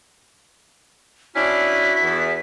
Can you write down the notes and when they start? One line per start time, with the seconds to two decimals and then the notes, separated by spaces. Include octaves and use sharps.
1.35 C#4 D4 E4 F#4 B6
2.03 E2